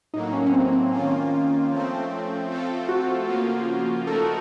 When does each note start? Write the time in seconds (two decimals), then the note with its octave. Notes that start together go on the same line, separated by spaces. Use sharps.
0.13 A2 F#3 A#3 D#4
0.33 C#4
0.46 C#4
0.52 C4
0.72 C4
0.92 D#3 A#3 C#4 F4
1.71 F3 A3 C4
2.49 F3 A3 C4 F4 A4
2.89 F#4
3.28 C#3 F3 A#3 F4
4.07 F3 A3 D#4 F#4 A4 A#4